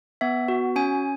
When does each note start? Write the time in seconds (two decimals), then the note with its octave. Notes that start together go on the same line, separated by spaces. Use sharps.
0.21 B3 E5
0.48 F#4
0.76 C#4 G#5